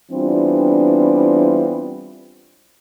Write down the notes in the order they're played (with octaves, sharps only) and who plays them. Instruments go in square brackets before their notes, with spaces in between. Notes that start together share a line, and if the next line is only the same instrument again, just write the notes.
[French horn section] E3 G3 B3 C4 D4 F4